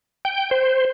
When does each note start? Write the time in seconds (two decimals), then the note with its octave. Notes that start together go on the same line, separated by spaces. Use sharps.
0.25 G5
0.51 C5